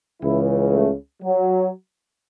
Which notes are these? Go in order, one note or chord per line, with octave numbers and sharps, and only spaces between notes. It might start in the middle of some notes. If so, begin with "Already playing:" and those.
C#2 C#3 E3 E4
A3
F#3